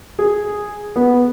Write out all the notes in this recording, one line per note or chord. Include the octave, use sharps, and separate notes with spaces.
G#4
B3